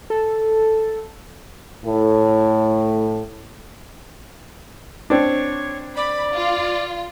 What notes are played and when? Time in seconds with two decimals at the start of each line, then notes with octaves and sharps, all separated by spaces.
0.10 A4
1.85 A2
5.10 C4 D4 C#5
5.96 D5 B5
6.34 F4